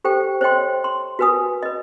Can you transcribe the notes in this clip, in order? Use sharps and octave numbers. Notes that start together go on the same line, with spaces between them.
G4 A4 C5 G5
C5 C#5 D#5 G5 C6
C6
F#4 A#4 B4 G#5 D#6
B4 D#5